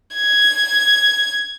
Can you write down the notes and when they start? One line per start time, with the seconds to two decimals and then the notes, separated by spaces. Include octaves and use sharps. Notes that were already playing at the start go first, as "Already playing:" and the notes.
0.15 G#6